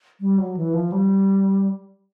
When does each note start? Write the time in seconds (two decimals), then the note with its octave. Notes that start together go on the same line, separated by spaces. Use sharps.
0.21 G3
0.38 F#3
0.57 E3
0.74 F3
0.92 G3